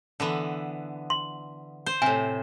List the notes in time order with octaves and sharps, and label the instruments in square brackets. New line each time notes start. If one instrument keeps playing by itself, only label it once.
[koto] D3 E3 B3
[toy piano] C6
[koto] C5
[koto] A2 C3 [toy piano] G#5